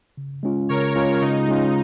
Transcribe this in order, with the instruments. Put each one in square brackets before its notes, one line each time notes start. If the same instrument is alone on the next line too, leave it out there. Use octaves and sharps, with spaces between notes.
[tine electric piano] C#3
G#3 C#4 F4
[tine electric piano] C#3 [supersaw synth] A#4 C#5
[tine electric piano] G#3 C#4 F4
[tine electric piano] C#3 [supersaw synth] D#4
[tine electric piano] G#3 C#4 F4